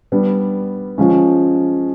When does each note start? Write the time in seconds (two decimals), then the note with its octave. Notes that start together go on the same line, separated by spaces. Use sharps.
0.12 G3 B3 D4
0.98 F3 G#3 C#4